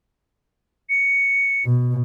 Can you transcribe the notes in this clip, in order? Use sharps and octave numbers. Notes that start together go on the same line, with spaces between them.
C#7
B2